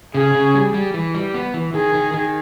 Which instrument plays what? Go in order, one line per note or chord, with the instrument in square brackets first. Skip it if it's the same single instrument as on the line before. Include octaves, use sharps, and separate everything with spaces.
[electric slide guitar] C#3 [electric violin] G#4
[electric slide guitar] C#3
G3
G3
E3
G3
B3
E3
[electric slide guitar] D#3 [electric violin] G#4
[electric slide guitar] D#3
D#3